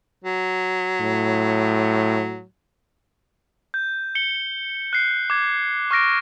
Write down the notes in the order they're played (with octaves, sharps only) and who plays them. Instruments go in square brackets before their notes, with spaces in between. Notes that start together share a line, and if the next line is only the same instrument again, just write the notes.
[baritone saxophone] F#3
[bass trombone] A2
[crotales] G6
C#7 G7
F#6 C7
D6 G#6
C#6 F6 A#6 D7